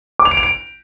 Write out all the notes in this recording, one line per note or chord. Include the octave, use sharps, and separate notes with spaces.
D6
F7
D7
F7
D7